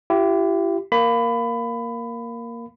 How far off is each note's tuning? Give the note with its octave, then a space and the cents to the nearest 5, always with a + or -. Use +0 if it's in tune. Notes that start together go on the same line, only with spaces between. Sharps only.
E4 +40 G4 -15
A#3 +0 B5 +20